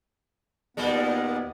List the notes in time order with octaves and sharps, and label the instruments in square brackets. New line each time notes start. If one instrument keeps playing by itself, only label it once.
[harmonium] D#2 B3 [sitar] A#2 G3 G#3